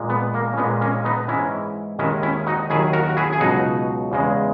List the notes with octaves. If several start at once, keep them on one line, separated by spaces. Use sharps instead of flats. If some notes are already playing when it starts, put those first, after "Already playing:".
Already playing: A#2 G#3
B3
A#3
C#4
A#2 G#3 B3
A#3 C#4
B3 D#4
G#2 E3 G#3 C#4 E4
D#2 D#3 G#3 C#4 E4
C#4 E4
D#4 F#4
D#2 D#3 F#3 E4 G#4
F#4 A#4
F#4
E4 G#4
G#4
C#2 B2 F#3 D#4 F#4
E2 C#3 G#3